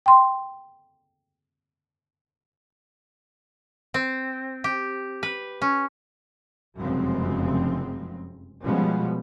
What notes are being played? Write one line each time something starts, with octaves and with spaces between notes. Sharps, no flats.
G5 C6
C4
G4
B4
C#4
F1 F#2 C#3 F3 G#3 C4
B2 F3 G3 G#3 B3 C#4